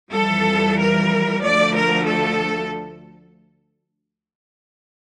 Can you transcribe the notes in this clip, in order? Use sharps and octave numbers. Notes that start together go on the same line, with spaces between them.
F2 E3 G3 A4
A#4
D2 D3 F3 A3 D5
A#4
A4